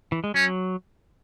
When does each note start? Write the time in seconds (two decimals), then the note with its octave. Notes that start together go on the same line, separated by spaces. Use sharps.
0.12 E3
0.24 G#3
0.34 F#3 C#4